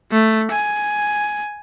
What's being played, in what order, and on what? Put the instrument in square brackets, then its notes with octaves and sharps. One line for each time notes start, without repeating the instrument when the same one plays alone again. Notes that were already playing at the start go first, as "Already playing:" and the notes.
[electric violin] A3
G#5